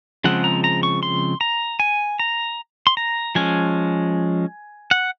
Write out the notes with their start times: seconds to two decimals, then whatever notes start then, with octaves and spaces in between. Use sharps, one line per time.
0.24 C#3 F3 G#3 C4 F#5
0.44 A#5
0.64 A#5
0.83 C#6
1.03 C6
1.41 A#5
1.80 G#5
2.19 A#5
2.87 C6
2.97 A#5
3.35 F3 G#3 C#4 G#5
4.91 F#5